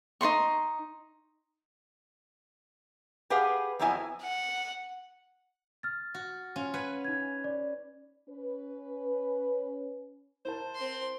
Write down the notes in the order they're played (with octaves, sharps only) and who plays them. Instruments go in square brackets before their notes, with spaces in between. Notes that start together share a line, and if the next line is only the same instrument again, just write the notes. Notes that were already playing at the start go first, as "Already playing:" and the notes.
[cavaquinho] D#4 C5 C6 C#6
[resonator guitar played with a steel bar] G4 G#4 B4 F5 F#5
F2 F3 F#3 B3 E4 G#5
[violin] F#5
[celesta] F6 A6
[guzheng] F#4
C#4 F4
B4 F#5 G#5
[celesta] D#4 G#6
D5
[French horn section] C#4 B4
[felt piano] E4 A#4 A5 [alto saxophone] C5
[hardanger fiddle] C4 C6